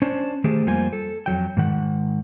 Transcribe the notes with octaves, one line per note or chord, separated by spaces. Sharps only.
C#4 D4 C5
D#3 A3 G4 G#4 C5
F2 G3 A#3 F4 C5 G#5
A4
F2 F#3 G5
G#2 D#3 F#5